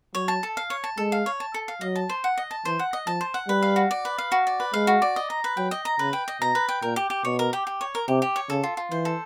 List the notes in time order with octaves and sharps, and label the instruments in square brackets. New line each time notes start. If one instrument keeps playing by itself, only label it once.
[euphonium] F#3 [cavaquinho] C#5
[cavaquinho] A5
A4
F5
C#5
A5
[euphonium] G#3 [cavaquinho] A4
[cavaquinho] F5
C#5
A5
A4
F5
[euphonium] F#3 [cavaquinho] D#5
[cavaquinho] A5
C5
F#5
D#5
A5
[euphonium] E3 [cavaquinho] C5
[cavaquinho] F#5
D#5
[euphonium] F3 [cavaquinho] A5
[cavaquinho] C5
F#5
[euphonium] G3 [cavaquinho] B4
[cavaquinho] F5
F#4
D5
B4
F5
F#4
D5
B4
[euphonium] G#3 [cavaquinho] F5
[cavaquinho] F#4
D5
D#5
A#5
B4
[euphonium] F#3 [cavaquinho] G5
[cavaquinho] D#5
A#5
[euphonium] C#3 [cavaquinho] B4
[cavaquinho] G5
D#5
[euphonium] B2 [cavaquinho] A#5
[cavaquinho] B4
G5
[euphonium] A#2 [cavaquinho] A#4
[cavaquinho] G4
G4
[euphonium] B2 [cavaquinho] C#5
[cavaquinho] A#4
G4
G4
C#5
A#4
[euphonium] C3 [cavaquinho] G4
[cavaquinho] G4
C#5
[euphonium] C#3 [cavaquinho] A4
[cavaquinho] F4
F4
[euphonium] E3 [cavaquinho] C5
[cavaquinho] A4